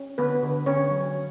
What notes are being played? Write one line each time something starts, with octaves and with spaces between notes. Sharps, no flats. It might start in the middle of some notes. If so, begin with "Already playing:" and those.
Already playing: C#4
D3 B3 B4
D3
D3 C#4 C#5
F#3
F#3